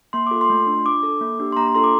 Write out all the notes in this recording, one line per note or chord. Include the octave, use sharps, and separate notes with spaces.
A#3 C6
F4 A4 D6
C6
A3
D4 F4
D4 D6
A4
A#3
D4 G4
C6
A#3 A#5
A#5
D4 F4 A4 C6
D6